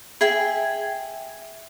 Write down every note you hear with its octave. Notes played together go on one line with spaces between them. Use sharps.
G#4 E5 G5 G#5